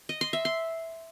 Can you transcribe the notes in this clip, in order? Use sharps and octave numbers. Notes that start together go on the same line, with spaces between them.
D#5
C6
E5
C6